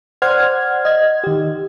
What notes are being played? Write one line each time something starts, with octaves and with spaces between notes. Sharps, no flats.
C5 D5 F#5 C6 F6 G#6
D#5 G#6
D#3 G4